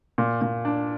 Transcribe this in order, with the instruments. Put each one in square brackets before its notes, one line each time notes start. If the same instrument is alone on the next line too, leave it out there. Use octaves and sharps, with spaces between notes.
[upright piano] A#2
A#2
D4